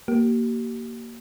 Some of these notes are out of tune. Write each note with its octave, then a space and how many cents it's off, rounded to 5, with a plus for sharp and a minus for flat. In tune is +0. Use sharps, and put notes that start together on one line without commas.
A#3 +0 G4 -35